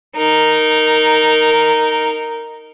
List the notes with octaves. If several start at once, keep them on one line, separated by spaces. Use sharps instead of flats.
D#4 A#4